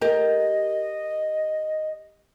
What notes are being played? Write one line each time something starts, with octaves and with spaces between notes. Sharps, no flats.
G4 A#4 D#5